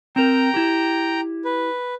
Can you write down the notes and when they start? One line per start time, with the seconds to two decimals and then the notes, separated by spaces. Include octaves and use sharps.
0.16 C4 A#4 G5 A#5
0.54 E4 G4
1.45 B4